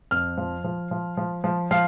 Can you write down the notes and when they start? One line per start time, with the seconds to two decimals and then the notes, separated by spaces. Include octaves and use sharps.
0.11 F2 F6
0.38 F3
0.64 F3
0.91 F3
1.17 F3
1.44 F3
1.71 F3 F5